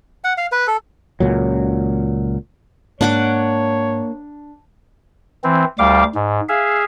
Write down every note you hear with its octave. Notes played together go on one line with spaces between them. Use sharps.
F#5
F5
B4
A4
C#2 A#2 F#3
G#2 A#3 D4 C#5 F#5 D6
E3 C4
D2 G3 F5 D6
G#2
G#4 E5 F5